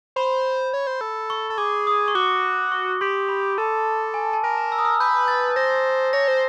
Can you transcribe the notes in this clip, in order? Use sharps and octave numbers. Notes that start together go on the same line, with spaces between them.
C5 B5
C#5
C5
A4
C#6
A4
G#4 D6
D#6
C#6
F#4 D6
C#6
G4 C6
B5
A4 A5
G#5
A5
A#4 G#5
A#5
E6
D#6
E6
B4 G6
A6
C5 A#6
C#5 A#6
C5